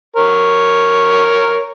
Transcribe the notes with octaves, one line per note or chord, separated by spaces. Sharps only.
A#4 C#5